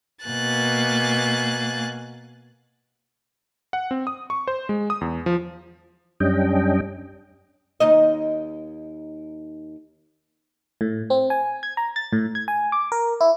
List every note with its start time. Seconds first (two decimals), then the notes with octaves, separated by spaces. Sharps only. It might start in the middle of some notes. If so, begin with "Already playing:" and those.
0.25 B2 A#3 G#5 F#6 A6
3.73 F#5
3.91 C4
4.07 D#6
4.30 C#6
4.48 C5
4.69 G#3
4.90 D#6
5.01 E2
5.26 F3
6.20 F#2 G3 C#4 D4 D#5 G5
7.80 D#2 D#4 D#5
10.81 A2
11.10 C4
11.30 G#5
11.63 G#6
11.77 A#5
11.96 A6
12.13 A2
12.35 G#6
12.48 G#5
12.72 D6
12.92 A#4
13.21 E4